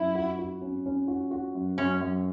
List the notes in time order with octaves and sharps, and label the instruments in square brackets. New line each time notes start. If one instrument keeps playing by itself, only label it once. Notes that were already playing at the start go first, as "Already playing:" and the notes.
Already playing: [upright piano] F#2 F#3 [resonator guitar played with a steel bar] E4
[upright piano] F#4
F#4
C#4
C#4
F#4
F#4
F#2
[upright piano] F#2 [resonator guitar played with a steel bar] C#4
[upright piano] F#2